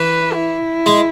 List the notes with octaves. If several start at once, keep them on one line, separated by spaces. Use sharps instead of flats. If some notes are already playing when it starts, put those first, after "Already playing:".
Already playing: E3 B4
E4
G#3